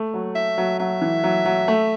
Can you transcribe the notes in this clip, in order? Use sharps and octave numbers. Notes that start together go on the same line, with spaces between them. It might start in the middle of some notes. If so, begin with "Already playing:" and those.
Already playing: A3
F#3
E5
F#3
F#3 E5
E3
F#3
F#3
A3